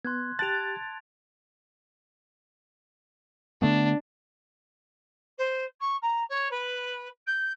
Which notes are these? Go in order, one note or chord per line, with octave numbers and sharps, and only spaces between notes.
B3 C6 F#6 G#6
G4 A5 F#6 A6 D7 F7
G#6
D3 A3 B3 D4
C5
C#6
A#5
C#5
B4
G6